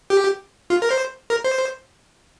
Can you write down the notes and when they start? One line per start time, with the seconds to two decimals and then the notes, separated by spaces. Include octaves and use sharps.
0.10 G4
0.70 F4
0.82 A#4
0.91 C5
1.30 A#4
1.44 C5